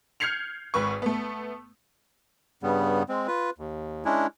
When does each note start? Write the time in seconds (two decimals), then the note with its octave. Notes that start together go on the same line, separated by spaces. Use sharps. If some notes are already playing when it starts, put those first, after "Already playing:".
0.20 F6 G6 G#6 C7 C#7 F7
0.74 G#1 G#2 B4 C#6
1.02 A3 B3
2.63 G2 C#3 G3 B3
3.09 G#3 C4
3.28 F4 B4
3.58 D#2
4.05 G#3 C#4 D4 E4